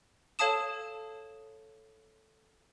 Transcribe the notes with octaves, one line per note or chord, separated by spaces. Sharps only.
A4 C#5 F5 A5 D#6 E7